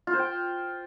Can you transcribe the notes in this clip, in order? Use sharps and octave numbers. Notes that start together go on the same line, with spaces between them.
F4
C5
G5